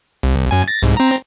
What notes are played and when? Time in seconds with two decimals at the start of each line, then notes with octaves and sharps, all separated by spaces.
0.23 C2
0.51 F#2 G#5
0.68 A6 A#6
0.83 C2 G#2
0.97 C4 A#5